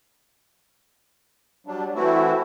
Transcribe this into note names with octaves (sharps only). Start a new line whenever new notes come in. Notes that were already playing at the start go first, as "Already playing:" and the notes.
F#3 G3 D4
E3 A3 C4 E4 F#4